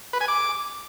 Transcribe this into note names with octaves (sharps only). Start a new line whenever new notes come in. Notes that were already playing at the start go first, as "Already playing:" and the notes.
B4
G#5
D6